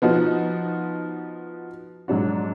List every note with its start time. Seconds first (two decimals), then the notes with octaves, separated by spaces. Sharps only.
0.02 F3 B3 D#4 F#4
2.08 G#2 F#3 D4 F#4